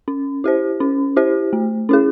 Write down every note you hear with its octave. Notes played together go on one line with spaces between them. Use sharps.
C#4
E4 G4 C5
C#4
E4 G4 C5
A3
C#4 E4 G#4